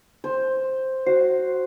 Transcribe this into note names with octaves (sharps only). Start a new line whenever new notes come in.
C5
F#4 C5